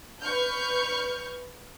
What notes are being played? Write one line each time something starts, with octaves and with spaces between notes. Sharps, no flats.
B4 C#6 F6 G6